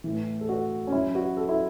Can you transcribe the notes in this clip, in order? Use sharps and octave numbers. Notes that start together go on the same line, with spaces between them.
A2 E3
A4
F#4
C#4
F#2 F#3 E4
F#4
A4
E4